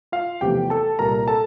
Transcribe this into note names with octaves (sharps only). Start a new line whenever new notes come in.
F4 F5
E2 C3 F3 A3 G4 G5
A4 A5
C2 A#2 G3 A#4 A#5
A4 A5